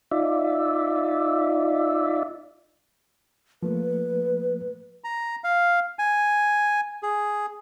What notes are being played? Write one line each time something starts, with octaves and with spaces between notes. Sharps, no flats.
D#4 F4 D5 E5
F3 A3 A#3 B4
A#5
F5
G#5
G#4